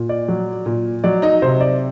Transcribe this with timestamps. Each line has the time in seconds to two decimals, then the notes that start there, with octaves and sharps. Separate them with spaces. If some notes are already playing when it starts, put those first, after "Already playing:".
Already playing: A#2
0.09 D5
0.28 F#3
0.66 A#2
1.04 F#3 D5
1.22 D#4 D#5
1.42 C3 C5
1.61 D5